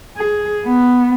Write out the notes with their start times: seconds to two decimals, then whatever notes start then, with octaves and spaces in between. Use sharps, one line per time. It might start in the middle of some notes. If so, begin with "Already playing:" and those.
0.17 G#4
0.66 B3